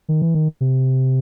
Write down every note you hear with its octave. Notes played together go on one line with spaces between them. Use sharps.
D#3
E3
D#3
C3